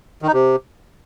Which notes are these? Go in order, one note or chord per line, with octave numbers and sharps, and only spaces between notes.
D#3
D#4
C3